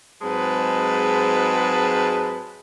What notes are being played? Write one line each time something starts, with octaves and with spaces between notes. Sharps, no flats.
G#2 F#3 G#3 C4 B4 A5